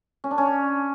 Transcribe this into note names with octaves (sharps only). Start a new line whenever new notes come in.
C#4
D4
C#4